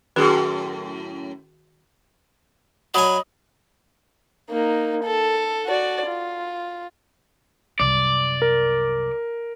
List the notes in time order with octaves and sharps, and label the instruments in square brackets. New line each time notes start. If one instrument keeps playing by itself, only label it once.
[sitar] F#2 A2 [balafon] D#3 G#4 [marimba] F#4
[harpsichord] F#3 G#5 [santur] D#5 [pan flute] B5
[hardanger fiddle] A#3 D#4
A4
F#4 D5
F4
[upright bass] C2 F#2 [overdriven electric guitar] D5
[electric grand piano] A#4